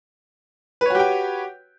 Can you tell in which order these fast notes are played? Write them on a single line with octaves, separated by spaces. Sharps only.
B4 C#5 F#4 G4 G5